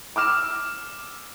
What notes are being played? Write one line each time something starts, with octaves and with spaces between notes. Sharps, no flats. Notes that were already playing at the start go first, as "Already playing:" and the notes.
D6 E6 F6 E7